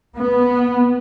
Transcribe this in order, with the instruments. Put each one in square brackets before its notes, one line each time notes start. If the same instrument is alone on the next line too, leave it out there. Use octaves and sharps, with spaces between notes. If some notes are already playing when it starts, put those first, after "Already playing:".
[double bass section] B3